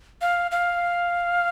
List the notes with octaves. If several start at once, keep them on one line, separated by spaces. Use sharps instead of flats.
F5
F5